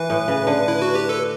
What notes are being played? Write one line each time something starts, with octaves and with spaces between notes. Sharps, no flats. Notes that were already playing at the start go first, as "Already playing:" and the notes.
Already playing: E3 B4
A2
C#3
D3
E4
F#4
G4
A4